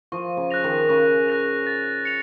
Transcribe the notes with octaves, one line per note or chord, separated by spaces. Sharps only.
F3 C#6
C#3
F#6 A#6 F7
D#3
C#3 C#6
F#6 A#6 F7
A6
C#7 F7